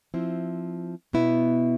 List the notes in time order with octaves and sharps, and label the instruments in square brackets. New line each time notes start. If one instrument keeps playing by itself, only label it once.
[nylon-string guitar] F3 C4 E4
B2 B3 E4